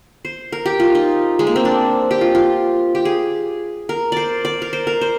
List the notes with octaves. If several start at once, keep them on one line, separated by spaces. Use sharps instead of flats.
C5
A#4
G4
F4
D#4
G#3
A#3
C4
D4
G4
F4
F4
G4
G#4
A#4
C5 D5
D5
A#4
C5
A#4
C5